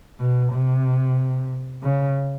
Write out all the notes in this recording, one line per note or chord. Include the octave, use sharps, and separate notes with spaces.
B2
C3
C#3